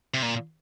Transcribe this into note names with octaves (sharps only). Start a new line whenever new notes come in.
C3
A#2